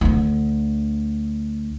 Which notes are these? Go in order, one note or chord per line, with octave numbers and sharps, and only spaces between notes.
D2 D3